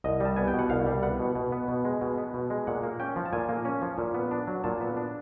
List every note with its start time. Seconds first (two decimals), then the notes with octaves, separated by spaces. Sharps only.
0.04 C2 D#5
0.20 G3 A5
0.36 B3 G#5
0.48 G5
0.54 B2 F#5
0.70 C2 F5
0.87 G3
1.03 B3 F#5
1.20 B2
1.35 B2
1.52 B3
1.68 B2
1.85 G#3
2.01 B2
2.18 B3
2.34 B2
2.50 G#3
2.67 A#2 F#5
2.83 A#3
3.00 C#4 G5
3.16 F3
3.26 A5
3.33 A#2 G#5
3.49 A#3
3.65 C#4
3.82 F3
3.98 A#2
4.14 B3
4.31 D4
4.47 F#3
4.64 A#2 A5
4.81 B3
4.97 D4